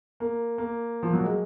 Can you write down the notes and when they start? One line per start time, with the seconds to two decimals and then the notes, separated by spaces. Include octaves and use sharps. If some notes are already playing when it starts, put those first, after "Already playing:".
0.20 A#3
0.58 A#3
1.03 F3
1.13 F#3
1.24 G#3